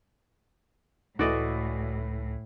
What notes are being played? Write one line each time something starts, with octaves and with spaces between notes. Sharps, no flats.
C#2 A2 E3 A3 F#4 D5 D#5